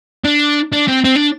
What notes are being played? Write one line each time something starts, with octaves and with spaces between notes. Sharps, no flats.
D4
D4
C4
C4
D4